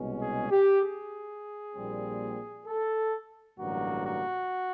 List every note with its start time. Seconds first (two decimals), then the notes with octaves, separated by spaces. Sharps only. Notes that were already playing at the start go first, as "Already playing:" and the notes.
Already playing: C2 B2 G#3 C#4
0.20 G#4
0.51 G4
0.82 G#4
1.75 A#1 A#2 G3 C4
2.67 A4
3.59 A1 G2 D3 F#3 A#3 F#4
4.06 F#4